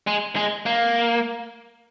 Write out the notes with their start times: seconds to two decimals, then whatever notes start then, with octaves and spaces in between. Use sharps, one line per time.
0.07 G#3
0.36 G#3
0.66 A#3